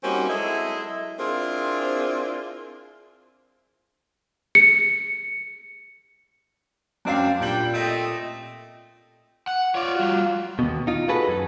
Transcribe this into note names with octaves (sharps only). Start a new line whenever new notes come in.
G3 A#3 C4 C#4 D#4 F#4
F#3 G#3 E4 A4 D#5
C4 D4 E4 F4 G#4 A#4
C#7
F#2 C4 D4 F5 C7
A#2 G3 D4 G5 F#7
A3 C4 D#5
F#5
F4 C#5 D5
G3 F#4
D#2 B2
D#4 F4
F#4 G#4 A4 B4
F#2